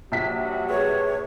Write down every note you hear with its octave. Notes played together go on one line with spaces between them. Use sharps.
A#1 F#3 G3 F#4 B6
G#4 B4 C#5